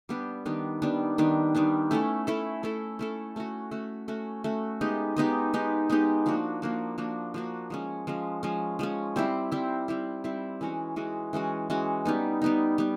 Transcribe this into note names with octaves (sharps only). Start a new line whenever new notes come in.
G3 B3 D4 G4
D#3 G3 B3 D4
D#3 G3 B3 D4
D#3 G3 B3 D4
D#3 G3 B3 D4
A3 C#4 E4 A4
A3 C#4 E4 A4
A3 C#4 E4 A4
A3 C#4 E4 A4
A3 C#4 F#4
A3 C#4 F#4
A3 C#4 F#4
A3 C#4 F#4
G#3 B3 D#4 G4
G#3 B3 D#4 G4
G#3 B3 D#4 G4
G#3 B3 D#4 G4
F3 A#3 D4 F#4
F3 A#3 D4 F#4
F3 A#3 D4 F#4
F3 A#3 D4 F#4
F3 G#3 C#4
F3 G#3 C#4
F3 G#3 C#4
F3 G#3 C#4
G3 C4 E4
G3 C4 E4
G3 C4 E4
G3 C4 E4
E3 G#3 C#4 F#4
E3 G#3 C#4 F#4
E3 G#3 C#4 F#4
E3 G#3 C#4 F#4
G3 B3 D#4
G3 B3 D#4
G3 B3